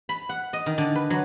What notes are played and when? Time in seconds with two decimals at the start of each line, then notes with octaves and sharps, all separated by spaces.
0.09 B5
0.29 F#5
0.53 D#5
0.66 D#3
0.78 D3
0.95 B4
1.10 F#3